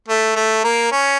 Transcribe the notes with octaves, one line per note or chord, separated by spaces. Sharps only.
A3
A3
A#3
C#4